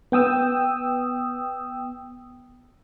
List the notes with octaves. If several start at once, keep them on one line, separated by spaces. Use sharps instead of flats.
B3 G5 D#6 E6